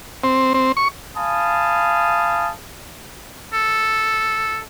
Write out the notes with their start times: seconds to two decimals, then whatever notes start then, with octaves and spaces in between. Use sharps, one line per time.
0.24 C4
0.54 C4
0.77 C#6
1.17 F5 G#5 A5 B5 D#6
3.53 A4